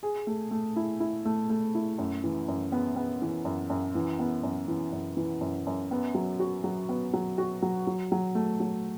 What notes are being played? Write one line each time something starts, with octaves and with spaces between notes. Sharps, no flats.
G#4
A3
A3
E4
E4
A3
A3
E4
F#2
E3
F#2
B3
B3
E3
F#2
F#2
E3
B3
F#2
E3
F#2
E3
F#2
F#2
B3
F#3
F#4
F#3
B3
F#3
F#4
F#3
F#3
F#3
A3
F#3